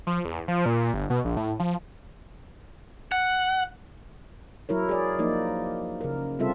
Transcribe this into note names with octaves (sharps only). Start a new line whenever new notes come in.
F3
E2
F3
A#2
G1
B2
A#1
A2
F3
F#5
F#3 E4 A#4 C#5
G#4 D5
F3 A#3 D#4 D5
C#3 A#4
C3 G3 C4 F4 A4 E5